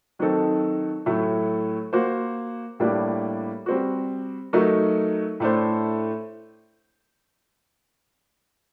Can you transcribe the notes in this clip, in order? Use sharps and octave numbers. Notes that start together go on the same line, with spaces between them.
D#3 F#3 C4 D#4 A4
A2 F#3 A3
A#3 F#4 C5
A2 G3 A#3 D4
G3 C4 F#4
F#3 A3 D#4 F#4 A#4
A2 A3 D4 A4 C5